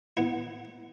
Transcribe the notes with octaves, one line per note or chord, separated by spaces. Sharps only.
B3 E4